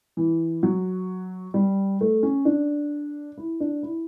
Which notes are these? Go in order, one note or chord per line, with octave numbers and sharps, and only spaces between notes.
E3
F#3
G3
A3
C#4
D4
E4
D4
E4